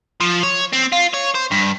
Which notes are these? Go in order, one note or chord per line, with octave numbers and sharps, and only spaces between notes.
F3
C#5
C4
F4
C#5
C5
G2